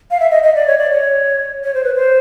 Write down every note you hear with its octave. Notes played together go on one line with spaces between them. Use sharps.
F5
E5
D#5
D#5
D5
C#5
D5
C#5
C#5
C5
B4
C5